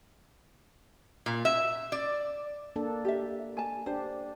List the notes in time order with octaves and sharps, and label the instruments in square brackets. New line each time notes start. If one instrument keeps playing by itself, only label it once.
[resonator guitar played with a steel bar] A#2
E5
D5
[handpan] A#3 D4 A4
[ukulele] G4 E5
G#5 A5
[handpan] D4 G4 [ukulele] C5